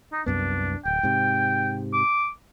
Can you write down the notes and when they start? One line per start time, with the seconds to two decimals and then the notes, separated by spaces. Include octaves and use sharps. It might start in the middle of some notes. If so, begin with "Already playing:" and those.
0.12 D#4
0.26 C2 F#2 B3 D4
0.85 D1 G5
1.03 G#2 C3
1.93 D6